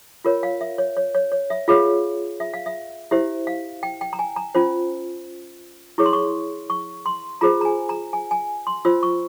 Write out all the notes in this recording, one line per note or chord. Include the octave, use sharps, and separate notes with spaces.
F4 A#4 C#5
F5
E5
C#5
C#5
C#5
C#5
E5
F4 G#4 C#5 F5
E5
F5
E5
E4 G4 C5 E5
F5
G5
G5
A#5
G#5
A#5
C#4 F4 C5
E4 G#4 C#5 C#6
C6
C#6
C#6
C6
F4 G#4 C5 A#5
A#5
G#5
A#5
G#5
G#5
C6
F4 C5 E6
C#6